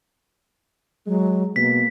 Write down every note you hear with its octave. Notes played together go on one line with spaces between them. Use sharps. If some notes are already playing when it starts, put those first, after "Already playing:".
F#3 G#3
B2 A#3 B6